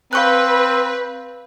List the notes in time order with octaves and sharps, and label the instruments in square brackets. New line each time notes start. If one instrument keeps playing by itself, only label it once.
[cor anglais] C4 [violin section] B4 [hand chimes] F5 C#6 F#6